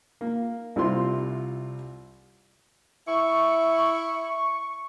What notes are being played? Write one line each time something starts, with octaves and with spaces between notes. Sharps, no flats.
A#3
C2 C3 E4 F4 C6
E4 C#6